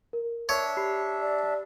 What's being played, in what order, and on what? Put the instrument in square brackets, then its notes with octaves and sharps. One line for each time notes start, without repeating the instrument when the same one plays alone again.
[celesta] A#4
[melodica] D4 E5 [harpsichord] C#5
[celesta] G4 B5 C7
[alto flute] D5